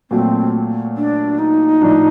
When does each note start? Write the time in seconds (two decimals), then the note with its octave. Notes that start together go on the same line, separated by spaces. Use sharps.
0.10 A#2 F#3 A3 C4
0.97 D4
1.39 D#4
1.82 A2 F3 A3 D4